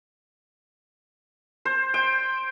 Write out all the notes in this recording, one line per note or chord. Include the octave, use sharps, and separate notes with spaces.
C5
G5